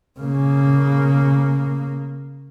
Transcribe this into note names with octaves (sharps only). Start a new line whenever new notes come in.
C#3 A#3